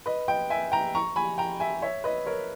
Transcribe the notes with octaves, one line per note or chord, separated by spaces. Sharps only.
B4 D#5
D#5 G5
E5 G#5
G5 A#5
A#5 C#6
G#5 B5
G5 A#5
E5 G#5
C#5 E5
B4 D#5
A#4 C#5